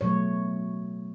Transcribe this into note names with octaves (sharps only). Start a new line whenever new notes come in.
B2 F#3 A3 C#5